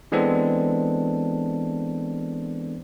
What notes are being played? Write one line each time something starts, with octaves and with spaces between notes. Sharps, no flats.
E3 G#3 B3 C4 D4 A4